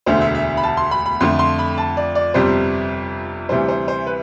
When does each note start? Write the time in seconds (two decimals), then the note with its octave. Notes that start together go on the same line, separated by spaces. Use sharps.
0.06 E1 D2 D3 C5
0.21 E5
0.35 E5
0.57 B5
0.63 A5
0.77 C6
0.91 B5
1.06 B5
1.21 F2 D3 F3 A3 C6
1.39 C6
1.59 B5
1.78 A5
1.97 D5
2.15 D5
2.34 G1 F2 C3 G3 C5
3.49 D2 C3 E3 G3 C5
3.68 C5
3.88 C5
4.07 B4